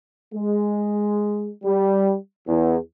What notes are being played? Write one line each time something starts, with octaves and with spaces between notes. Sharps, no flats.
G#3
G3
E2